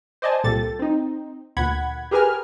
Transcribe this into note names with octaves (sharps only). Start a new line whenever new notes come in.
C5 D5 D#5 G#5 A5
C2 A#2 G4 A4 A6
C4 D#4
D2 A#2 F#5 B5 G#6
G4 G#4 A#4 B4 G#5 F6